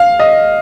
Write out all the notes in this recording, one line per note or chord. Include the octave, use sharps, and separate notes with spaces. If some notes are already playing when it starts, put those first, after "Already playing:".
Already playing: F5
D#5